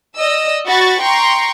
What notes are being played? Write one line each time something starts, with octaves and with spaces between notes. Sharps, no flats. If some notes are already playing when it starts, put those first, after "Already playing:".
D5 D#5 E6
F#4 B5 C#6 A6
G5 A#5 C6 C#6